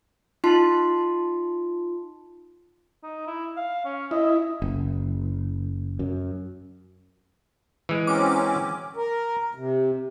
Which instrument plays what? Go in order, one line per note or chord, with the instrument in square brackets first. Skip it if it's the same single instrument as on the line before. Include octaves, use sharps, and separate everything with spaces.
[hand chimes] D#4 F4 A5 C6
[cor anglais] D#4
E4
F5
C#4
[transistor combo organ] E4 [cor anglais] D#5
[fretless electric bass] F#1
F#2
[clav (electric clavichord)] E3 G#3
[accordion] F#3 C4 C#4 [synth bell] D6
[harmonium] A#4
C3